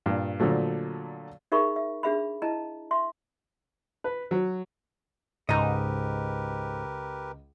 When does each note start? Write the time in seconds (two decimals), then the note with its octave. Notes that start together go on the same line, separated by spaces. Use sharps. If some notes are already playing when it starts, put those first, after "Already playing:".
0.06 G2 A#2
0.40 A#2 D3 F3 F#3 A3
1.52 D#4 G#4 A#4 E5 B5 C#6
1.76 E5
2.03 D4 G#4 E5 B5
2.42 E4 D#5 A5 A#5
2.91 E5 C6
4.04 B4
4.31 F#3
5.49 C#2 G#2 G4 A#4 B4 D#5 A#5